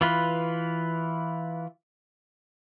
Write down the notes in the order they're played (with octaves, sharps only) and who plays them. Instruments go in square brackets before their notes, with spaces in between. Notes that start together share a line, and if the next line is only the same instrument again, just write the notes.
[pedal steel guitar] E3 F4 B4